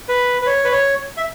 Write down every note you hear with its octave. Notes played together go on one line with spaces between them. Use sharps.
B4
B4
C#5
B4
C#5
E5